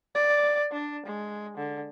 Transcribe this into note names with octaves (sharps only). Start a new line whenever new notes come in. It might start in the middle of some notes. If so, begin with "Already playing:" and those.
D5
D4
G#3
D3